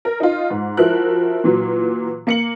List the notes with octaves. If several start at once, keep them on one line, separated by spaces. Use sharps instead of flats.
A#4
D#4 F4
G#2
F3 E4 F#4 A#4 F#6
A#2 E3 F#3
A#3 C#7 F#7